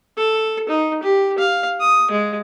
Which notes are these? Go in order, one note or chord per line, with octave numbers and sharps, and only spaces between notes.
A4
D#4
G4
F5
D#6
G#3